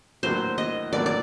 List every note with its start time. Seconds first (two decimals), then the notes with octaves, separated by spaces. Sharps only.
0.23 A2 F#3 A#3 D4 F#4 C5
0.58 D#5
0.92 A2 F#3 A#3 D4 F#4 D5
1.06 D5